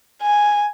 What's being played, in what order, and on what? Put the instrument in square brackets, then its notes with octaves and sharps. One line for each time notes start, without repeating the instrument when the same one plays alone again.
[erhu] G#5